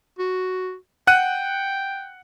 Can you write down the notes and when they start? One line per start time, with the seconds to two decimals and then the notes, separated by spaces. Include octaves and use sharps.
0.19 F#4
1.07 F#5 G5 F#6 D#7